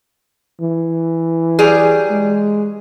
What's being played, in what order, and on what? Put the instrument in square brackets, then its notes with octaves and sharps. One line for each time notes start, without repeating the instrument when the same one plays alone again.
[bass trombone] E3
[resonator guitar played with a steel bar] F#3 G3 G#4
[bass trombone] G#3